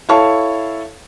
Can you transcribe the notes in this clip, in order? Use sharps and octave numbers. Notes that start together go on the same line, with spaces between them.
E4 A4 C#5 F5 A5 C#6